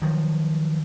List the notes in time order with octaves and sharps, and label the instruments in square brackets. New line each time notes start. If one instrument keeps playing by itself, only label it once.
[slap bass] D#3 F3 F#3